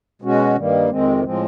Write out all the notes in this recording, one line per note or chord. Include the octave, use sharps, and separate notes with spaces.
B2 G#3 C#4 F#4
G2 D#3 G3 A#3
F2 C3 D#3 G#3 C4
A2 F3 G#3 C4